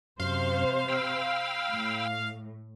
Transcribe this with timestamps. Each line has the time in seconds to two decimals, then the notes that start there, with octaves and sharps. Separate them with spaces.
0.20 F#2 C3 C5 F5 C6
0.89 G5 B5 E6
1.72 A2